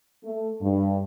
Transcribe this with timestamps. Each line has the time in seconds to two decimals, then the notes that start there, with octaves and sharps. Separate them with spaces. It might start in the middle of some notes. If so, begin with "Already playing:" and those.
0.24 A3
0.61 G2